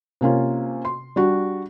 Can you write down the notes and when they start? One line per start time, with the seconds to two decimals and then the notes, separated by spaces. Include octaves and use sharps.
0.21 C3 A#3 C#4 F4
0.85 C6
1.16 G3 D4 F#4